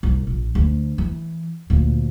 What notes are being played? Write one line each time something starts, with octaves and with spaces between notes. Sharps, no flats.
C2
A#1
D2
E3
D2 A#2